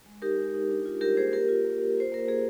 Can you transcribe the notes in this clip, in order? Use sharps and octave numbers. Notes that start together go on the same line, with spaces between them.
G#3
D#4 G4 A#4
G#3
D#4
D4
F4
G3 G4 A#4
A#3 G#4 C5
A#3 G4 A#4
F4
A#3
F4
F4 C5
A#3 A#4
A#3 G#4